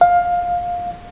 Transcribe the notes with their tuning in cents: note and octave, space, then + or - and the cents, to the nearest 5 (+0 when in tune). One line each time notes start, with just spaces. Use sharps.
F5 +15